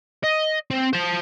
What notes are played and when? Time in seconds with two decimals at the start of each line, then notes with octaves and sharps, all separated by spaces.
0.24 D#5
0.71 C4
0.93 C5 A5